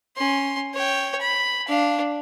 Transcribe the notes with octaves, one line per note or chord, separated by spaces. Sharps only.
C#4 C6
C#5 G5
B5
D4 F5